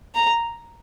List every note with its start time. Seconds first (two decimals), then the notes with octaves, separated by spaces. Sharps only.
0.15 A#5